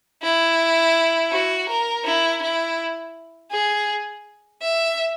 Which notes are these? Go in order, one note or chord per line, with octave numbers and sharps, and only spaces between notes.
E4
F#4
A#4
E4
E4
G#4
E5